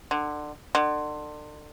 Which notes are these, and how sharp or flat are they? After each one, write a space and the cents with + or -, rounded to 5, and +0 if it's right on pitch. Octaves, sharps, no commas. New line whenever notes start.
D3 +25
D3 +35